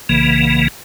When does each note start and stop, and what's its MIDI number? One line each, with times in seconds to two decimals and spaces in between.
0.09 0.68 35
0.09 0.68 49
0.09 0.68 52
0.09 0.68 58